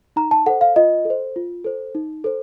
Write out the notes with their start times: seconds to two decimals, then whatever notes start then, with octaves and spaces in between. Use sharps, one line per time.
0.16 D#4 A#5
0.31 A5
0.46 A4 F#5
0.49 C5
0.61 F5
0.76 F4 D#5
1.05 A4
1.10 C5
1.36 F4
1.64 A4 C5
1.95 D#4
2.24 A4 C5